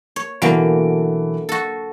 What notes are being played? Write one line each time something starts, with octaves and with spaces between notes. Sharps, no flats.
C#5
B1 D3 E3 F#3 A#3 D7
F#4 A4